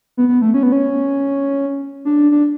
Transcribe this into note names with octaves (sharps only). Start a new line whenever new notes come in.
B3
B3
A3
C#4
B3
C#4
D4
D4